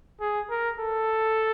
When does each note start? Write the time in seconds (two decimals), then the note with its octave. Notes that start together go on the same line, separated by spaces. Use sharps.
0.21 G#4
0.50 A#4
0.79 A4